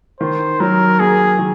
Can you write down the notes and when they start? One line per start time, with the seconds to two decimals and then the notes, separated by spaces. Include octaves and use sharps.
0.20 D#3 C5
0.60 F#3 A#4
1.00 A#3 G#4
1.39 D#3